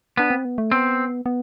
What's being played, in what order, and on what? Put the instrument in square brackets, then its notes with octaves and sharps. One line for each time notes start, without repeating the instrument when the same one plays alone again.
[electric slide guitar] B3 [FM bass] D4
[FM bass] C4
B3
A3
[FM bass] B3 [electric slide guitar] C4
[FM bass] B3